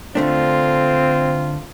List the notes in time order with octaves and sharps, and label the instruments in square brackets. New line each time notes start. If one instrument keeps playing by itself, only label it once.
[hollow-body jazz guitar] D3 A3 D4 [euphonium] C4 [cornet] F4